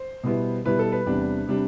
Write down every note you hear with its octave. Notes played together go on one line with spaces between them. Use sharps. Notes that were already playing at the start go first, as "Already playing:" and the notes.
Already playing: C5
B2 G3 B3 E4
B2 G3 B3 E4 B4
A4
B4
E2 C3 G3 D4
C3 G3 D4